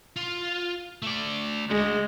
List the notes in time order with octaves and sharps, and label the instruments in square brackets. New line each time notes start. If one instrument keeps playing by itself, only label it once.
[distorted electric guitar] F4
A3 D5
[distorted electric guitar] D2 G2 [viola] G#3